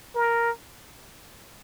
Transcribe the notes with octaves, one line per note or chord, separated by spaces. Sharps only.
A#4